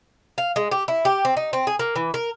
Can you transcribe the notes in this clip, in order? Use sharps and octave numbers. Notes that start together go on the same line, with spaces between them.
F5
G#3
G4
E4
G4
C4
D#4
C4
G#4
A#3
E3
A#4